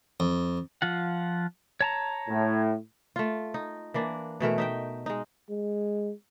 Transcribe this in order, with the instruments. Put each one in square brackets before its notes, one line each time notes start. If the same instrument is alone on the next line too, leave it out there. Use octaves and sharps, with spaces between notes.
[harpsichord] F2
[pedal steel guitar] F3 F4 F#5
C#5 A5 A#5
[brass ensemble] A2
[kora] A3 F4
D#4
E3 A#3 D4
B2 E3 A3 A#4
D#4 E5 G5
G#3 D#4
[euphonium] G#3